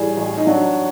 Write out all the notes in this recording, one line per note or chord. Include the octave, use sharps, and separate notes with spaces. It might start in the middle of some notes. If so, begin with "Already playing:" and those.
Already playing: A2 E3 G3 G#4
A1
D#4
F#3 D4